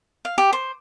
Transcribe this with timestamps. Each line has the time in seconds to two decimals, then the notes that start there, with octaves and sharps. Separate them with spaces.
0.25 F5
0.38 G4
0.53 C5